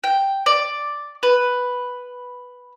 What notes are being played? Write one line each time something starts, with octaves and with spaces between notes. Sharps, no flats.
G5
D5
B4